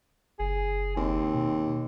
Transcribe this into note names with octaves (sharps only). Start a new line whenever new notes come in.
F#1 G#4
D#2 C4
B2